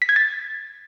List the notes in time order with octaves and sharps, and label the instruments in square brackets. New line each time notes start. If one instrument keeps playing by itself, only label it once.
[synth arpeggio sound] B6
G#6
A6